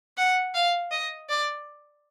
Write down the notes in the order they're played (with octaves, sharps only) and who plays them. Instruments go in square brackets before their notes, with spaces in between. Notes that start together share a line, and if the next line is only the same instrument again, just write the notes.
[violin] F#5
F5
D#5
D5